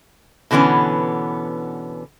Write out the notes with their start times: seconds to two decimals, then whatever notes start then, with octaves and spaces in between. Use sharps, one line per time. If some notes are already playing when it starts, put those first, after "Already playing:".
0.51 B2 D3 E3 B3 C#4